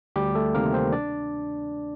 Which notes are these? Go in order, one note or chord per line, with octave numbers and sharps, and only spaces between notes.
D2 G3 G4
A3 A4
C3 D#3 A#3 A#4
C4 C5
D4 D5